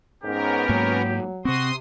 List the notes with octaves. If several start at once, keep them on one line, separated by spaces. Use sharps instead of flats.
G#2 B3 C#4 G4 A#4
G#2 F#3 A#3
C3 C4 F#4 C6 D#6